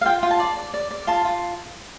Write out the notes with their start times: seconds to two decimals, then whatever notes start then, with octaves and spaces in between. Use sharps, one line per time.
0.01 F5
0.05 F4 G5
0.23 F4
0.31 A5
0.39 D5
0.57 D5
0.74 D5
0.91 D5
1.07 F4 A5
1.25 F4